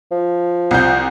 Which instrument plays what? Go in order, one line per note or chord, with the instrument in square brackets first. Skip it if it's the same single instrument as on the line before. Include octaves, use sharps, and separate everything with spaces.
[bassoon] F3
[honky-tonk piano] C2 G6